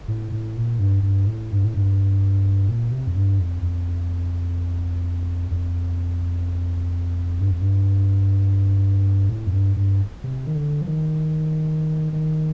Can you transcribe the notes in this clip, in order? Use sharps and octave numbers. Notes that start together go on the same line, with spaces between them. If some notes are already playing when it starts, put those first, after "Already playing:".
A2
A2
A#2
G2
G2
A2
G2
A2
G2
A#2
C3
F2
G2
F2
F2
F2
G2
F2
G2
A2
F2
G2
G2
C3
D#3
D3
F3
D#3
D#3